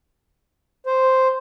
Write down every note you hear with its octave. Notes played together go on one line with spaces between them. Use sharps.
C5